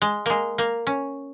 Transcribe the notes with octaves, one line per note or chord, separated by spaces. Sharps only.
G#3
G#3 A#3
A#3
C#4